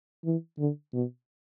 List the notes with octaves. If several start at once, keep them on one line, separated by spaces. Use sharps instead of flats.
E3
D3
B2